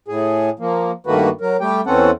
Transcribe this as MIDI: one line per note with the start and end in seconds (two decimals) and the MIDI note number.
0.08 0.50 45
0.08 0.50 68
0.59 0.91 53
0.59 0.91 58
1.07 1.29 43
1.07 1.29 51
1.07 1.29 57
1.07 1.29 58
1.07 1.29 66
1.07 1.29 71
1.41 1.57 54
1.41 1.57 70
1.61 1.81 55
1.61 1.81 57
1.61 1.81 67
1.61 1.81 79
1.86 2.11 40
1.86 2.11 52
1.86 2.11 60
1.86 2.11 61
1.86 2.11 69
1.86 2.11 78